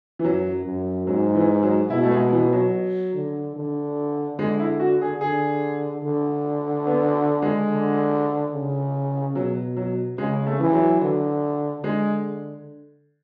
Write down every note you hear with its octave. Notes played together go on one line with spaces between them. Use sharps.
E3
F#2 F#3
F#2
G#2 F#3
E3
F#3
B2 E4
A3
G#3
E3
F#3
D3
D3
D3 G#3
E4
F#4
G#4
D3 G#4
D3
B3
G#3
D3
C#3
B2 F#3
F#3
C#3 G#3
A3
E3
F#3
D3
D3 G#3